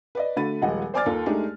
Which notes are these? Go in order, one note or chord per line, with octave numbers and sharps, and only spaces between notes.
B4 D5 D#5
D3 A3 F#4 B5 A6 D#7
D#1 F3 G#3 D#5 F#5
C5 D5 G#5 D6 F6 A6
D#2 F4 A4 A#4
G#3 A3 D4 D#4 G4 G#4